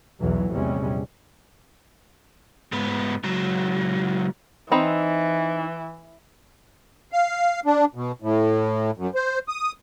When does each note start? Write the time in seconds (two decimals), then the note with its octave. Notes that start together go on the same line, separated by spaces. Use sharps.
0.20 B1 E2 E3 F#3
0.51 A#1 E2 C3 G3 G#3 C#4
2.72 G#2 B3
3.24 C#2 F#3
4.71 E3 C4 D#4 B5
7.12 F5
7.66 D4
7.95 B2
8.22 A2
8.98 F#2
9.15 C5
9.48 D#6